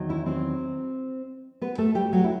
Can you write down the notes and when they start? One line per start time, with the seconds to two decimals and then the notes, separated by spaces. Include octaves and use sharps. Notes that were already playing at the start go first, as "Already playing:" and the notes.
Already playing: E2 D#3 F#3
0.09 E4 E5
0.26 C4 C5
1.62 B3 B4
1.78 A3 A4
1.95 G3 G4
2.13 F#3 F#4
2.24 E4